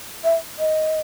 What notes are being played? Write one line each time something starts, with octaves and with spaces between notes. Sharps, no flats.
E5
D#5